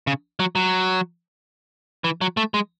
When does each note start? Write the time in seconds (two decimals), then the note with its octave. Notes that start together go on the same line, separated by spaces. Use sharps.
0.07 C#3
0.40 F#3
0.55 F#3
2.04 E3
2.21 F#3
2.37 A3
2.54 G#3